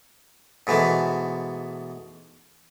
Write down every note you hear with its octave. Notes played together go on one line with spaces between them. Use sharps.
G#2 B2 E3 A3